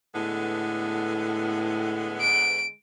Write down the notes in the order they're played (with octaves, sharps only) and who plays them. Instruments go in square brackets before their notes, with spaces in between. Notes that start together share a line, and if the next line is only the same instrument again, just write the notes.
[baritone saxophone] A2 [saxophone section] D3 G#3 B3
[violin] D7